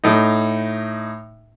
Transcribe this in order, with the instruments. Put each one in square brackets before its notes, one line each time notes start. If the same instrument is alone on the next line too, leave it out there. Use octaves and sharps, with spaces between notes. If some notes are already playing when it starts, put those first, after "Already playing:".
[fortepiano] A2 D#4